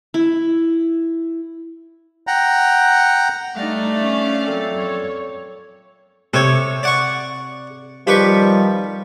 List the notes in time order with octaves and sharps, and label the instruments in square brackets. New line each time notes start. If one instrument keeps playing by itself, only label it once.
[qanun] E4
[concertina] F#5 G5 A#5
[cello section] G3 D4 D#4 [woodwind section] A3 [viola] D5 F5
[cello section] C#4
[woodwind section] A#2 C4 A4 [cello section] F#3
[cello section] C#5
[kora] C3 [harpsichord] A4 C#5
[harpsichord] D5 F#5 C#6
[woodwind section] D#3 F3 G3 [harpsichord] G4 B4 C#6